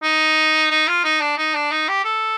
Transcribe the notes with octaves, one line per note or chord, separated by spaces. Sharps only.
D#4
D#4
F4
D#4
D4
D#4
D4
D#4
G4
A4